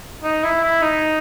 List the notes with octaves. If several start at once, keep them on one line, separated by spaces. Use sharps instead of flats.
D#4
E4
E4
D#4